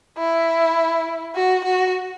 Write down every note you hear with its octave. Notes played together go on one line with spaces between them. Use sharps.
E4
F#4
F#4